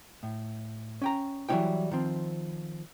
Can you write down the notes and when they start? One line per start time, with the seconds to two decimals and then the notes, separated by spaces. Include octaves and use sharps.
0.23 A2
1.02 C#4 G5 A#5
1.49 E3 F#3 G3 C#4 E4 G5
1.91 D#3 F3 C4